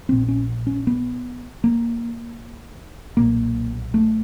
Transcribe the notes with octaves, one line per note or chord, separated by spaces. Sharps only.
A#1 A#2 C4
C#4
C#4
B3
A#3
B1 A#2 A#3
A3